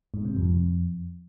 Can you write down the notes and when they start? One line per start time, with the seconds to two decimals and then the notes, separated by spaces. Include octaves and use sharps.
0.14 G#2
0.25 C3
0.36 F2